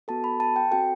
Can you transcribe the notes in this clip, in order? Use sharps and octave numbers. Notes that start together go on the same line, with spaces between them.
B3 F#4 A4 A5
B5
A5
G5
C4 F#4 A4 G5